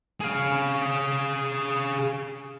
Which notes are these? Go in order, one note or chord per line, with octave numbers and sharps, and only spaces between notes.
G#4 F5